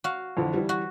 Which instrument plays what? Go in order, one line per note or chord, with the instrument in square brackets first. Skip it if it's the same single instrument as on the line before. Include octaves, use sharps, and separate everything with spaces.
[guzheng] F#4 F5
[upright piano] F2 D3 E3
E3 G3
[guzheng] F#4